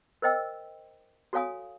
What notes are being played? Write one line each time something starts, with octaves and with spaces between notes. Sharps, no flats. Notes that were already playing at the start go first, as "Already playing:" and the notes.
A#4 C5 D#5 G5 E6
F#4 A4 C#5 F5 G#5 D#6